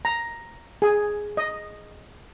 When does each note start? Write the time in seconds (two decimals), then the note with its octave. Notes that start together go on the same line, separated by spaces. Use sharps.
0.05 A#5
0.82 G#4
1.37 D#5